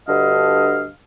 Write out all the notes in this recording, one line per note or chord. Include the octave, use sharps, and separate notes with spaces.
D2 G2 D3 D#5 F5